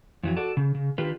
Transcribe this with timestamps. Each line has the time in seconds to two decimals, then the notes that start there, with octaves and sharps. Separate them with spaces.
0.23 F2 E3 F#3
0.37 F#4 A4 D5 A5
0.57 C#3
0.75 C#3
0.98 D#3 D4 F4 G4 B4